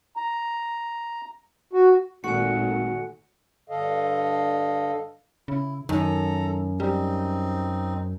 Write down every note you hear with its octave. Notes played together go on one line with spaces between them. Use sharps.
A#5
F#4
G#1 A#2 D#3 A3 F#4 G#5 C#7
G2 D3 A4 D#5 F5
C#3 E4
F#2 D#3 A4 A#5
G3 C4 D#4